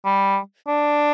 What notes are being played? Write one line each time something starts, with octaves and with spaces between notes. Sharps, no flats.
G3
D4